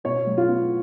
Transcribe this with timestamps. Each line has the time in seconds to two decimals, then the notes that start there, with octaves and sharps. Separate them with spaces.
0.04 B2 C#5
0.26 F#3
0.37 F4
0.48 B3